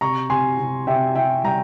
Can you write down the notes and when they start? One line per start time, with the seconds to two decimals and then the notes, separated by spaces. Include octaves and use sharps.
0.01 C3 A#5 C#6
0.30 C3 G#5 C6
0.59 C3
0.87 C3 E5 G5
1.15 C3 E5 G5
1.44 G3 G5 A#5